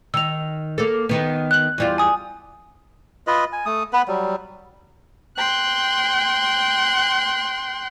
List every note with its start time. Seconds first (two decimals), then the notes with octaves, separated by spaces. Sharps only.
0.14 D#3 E6 F7
0.78 A#3 A4
1.09 D#3 B3
1.51 F#6 F#7
1.78 E2 G3 F4
1.98 G#5 D#6
3.27 F4 B4 D#5
3.53 G#5
3.66 A3 D#6
3.93 B3 B4
4.08 F#3 G3
5.36 G5 C6 F#6